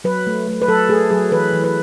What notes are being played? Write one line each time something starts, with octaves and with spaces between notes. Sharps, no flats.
F#3 B4
A3
A3
B4
F#3 A4
A3 G#4
F#3 G#4
E3 B4
E3
B4